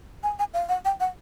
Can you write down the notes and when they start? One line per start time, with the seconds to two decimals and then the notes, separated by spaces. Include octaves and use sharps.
0.23 G#5
0.39 G#5
0.53 F5
0.69 F#5
0.85 G5
1.00 F#5